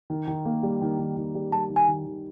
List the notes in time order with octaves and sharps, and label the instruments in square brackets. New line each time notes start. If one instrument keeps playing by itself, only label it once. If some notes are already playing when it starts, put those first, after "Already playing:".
[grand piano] D#3
D#3
A#3
G3
D#3
D#3
D#3
G3
[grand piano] G3 [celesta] A5
[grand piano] D#3
[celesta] G#5
[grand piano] D#3
D#3